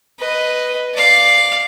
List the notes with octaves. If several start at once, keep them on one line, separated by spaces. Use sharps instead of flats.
B4 D#5
D5 F5